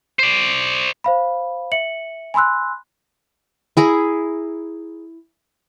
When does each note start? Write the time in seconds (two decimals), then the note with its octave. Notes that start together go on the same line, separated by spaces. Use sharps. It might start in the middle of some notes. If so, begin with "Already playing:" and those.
0.19 C5 D5
1.04 C5 F5 B5
1.72 E5 C#7 F#7
2.34 G#5 B5 C6 E6 F#6
3.77 E4 G#4 A#5 B5